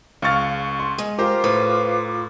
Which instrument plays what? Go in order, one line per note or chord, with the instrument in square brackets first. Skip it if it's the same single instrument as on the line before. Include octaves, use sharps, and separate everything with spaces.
[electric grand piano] C#2 C#6 F6 [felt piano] F5 A6
[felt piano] C6
[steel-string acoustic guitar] G#3
[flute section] F4 D6 [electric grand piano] G4 C5 [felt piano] A#4
[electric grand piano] A2 [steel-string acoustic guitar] B4 C5